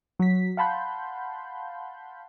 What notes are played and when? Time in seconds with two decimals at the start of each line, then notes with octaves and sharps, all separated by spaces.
0.19 F#3 B6
0.57 F5 F#5 A5 B5 C6 G6